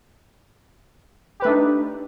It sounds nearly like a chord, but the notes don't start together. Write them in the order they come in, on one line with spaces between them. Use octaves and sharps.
G4 B4 A3 D4 D#4